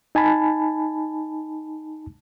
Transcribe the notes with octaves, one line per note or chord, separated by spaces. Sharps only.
D#4 G#5 A5 B5